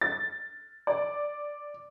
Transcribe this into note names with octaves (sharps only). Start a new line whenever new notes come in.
A6
D5